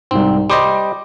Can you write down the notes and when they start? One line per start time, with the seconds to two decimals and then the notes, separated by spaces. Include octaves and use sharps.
0.11 C2 G#2 C4
0.50 G3 C5 D#5 D6